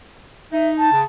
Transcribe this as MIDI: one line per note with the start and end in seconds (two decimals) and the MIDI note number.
0.53 0.90 63
0.53 0.69 76
0.79 1.01 81
0.92 1.04 49